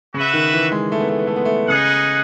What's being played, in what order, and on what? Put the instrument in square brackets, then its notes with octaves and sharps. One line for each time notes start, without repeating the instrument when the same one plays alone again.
[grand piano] C#3 [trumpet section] F#4 B4 E5
[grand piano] D#3
E3
G#3
A3
B3
A3
B3
A3
B3
A3
[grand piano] C#3 [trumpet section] D#4 G#4 D#5 F#5